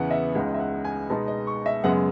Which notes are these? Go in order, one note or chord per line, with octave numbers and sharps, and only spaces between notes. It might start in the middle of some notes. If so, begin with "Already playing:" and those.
Already playing: E2 C#3 E3 B3 F#5
E5
C#2 C#3 G#3 D#4 F#5
E5
F#5
G#5
B2 G#3 B3 D#4 A5
D#5
C#6
E5
F#2 C#3 G#3 B3 F#5